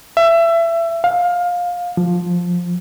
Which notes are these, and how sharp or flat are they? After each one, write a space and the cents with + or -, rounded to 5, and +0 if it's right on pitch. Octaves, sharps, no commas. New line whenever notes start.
E5 +25
F5 +20
F3 +10